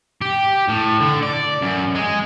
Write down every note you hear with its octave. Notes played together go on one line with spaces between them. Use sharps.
G4
A2
D3
D5
F#2
G#3